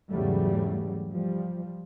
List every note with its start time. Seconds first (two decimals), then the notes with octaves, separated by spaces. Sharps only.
0.11 E2 G#2 C#3 F#3 G3 A3
1.08 F3 G3